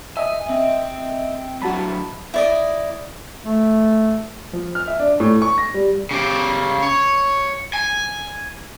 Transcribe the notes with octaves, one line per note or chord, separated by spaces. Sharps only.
D#5 E5 G#5
C4
D3 F#3 F#4 A5 B5
E4 D5 D#5
A3
F3
F6
E5
D4
A2
C#6
A#6
G3
C#3 G4
C#5
G#5